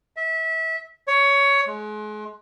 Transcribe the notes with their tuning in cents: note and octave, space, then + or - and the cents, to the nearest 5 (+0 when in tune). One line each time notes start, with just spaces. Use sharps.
E5 -25
C#5 +15
G#3 +35